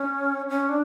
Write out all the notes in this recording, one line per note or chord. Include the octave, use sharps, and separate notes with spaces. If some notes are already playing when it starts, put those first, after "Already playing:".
Already playing: C#4
C#4
D4